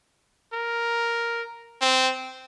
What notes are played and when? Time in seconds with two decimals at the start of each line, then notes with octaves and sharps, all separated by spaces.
0.53 A#4
1.82 C4